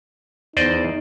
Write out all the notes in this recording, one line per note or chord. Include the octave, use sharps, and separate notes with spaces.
E2 D#4 C5 D5 D#5